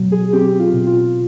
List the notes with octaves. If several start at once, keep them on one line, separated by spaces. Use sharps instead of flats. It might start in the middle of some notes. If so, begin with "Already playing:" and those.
Already playing: B2 F#3
G#4
C4 G4
F4
B2
F4